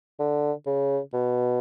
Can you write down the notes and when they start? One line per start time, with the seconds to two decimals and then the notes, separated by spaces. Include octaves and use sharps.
0.19 D3
0.66 C#3
1.13 B2